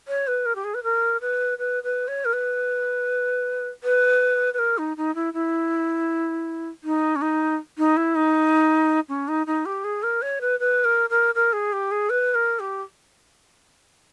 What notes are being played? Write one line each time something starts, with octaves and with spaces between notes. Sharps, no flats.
C#5
B4
A#4
G4
G#4
B4
A#4
B4
B4
B4
C#5
A#4
B4
B4
B4
A#4
D#4
D#4
E4
E4
D#4
C#4
D#4
D#4
E4
D#4
C#4
D#4
D#4
G4
G#4
A#4
C#5
B4
B4
A#4
A#4
A#4
G#4
G4
G#4
B4
A#4
G4